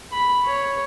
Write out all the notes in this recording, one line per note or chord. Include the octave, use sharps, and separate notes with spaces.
B5
C#5